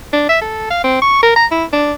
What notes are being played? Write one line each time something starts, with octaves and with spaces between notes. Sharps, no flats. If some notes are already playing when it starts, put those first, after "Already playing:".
D4
E5
A4
F5
C4
C#6
A#4
A#5
E4
D4